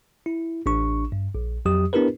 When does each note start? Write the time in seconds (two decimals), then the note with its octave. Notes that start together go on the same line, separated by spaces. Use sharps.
0.26 E4
0.66 A1 D4 C#6
1.12 G2
1.35 A#1
1.66 F2 F#3 G4 D#6
1.93 B3 D4 E4 G4 A#4 B4